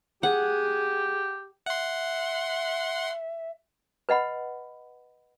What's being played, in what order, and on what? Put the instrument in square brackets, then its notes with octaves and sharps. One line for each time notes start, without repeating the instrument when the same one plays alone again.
[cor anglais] G4 [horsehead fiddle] G#4 [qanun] F#5
[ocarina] E5 [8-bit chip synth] F#5 C6
[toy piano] B4 D#5 F#5 B5